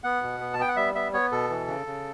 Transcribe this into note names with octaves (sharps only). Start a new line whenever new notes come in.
B3 F#5
B2
B3
A5
B3 G5
F#5
G3 E5
B3 E5
B3 C#5
B2 A4
E3
C#3
C#3